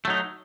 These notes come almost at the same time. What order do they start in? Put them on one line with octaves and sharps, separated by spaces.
A3 F#3 D#4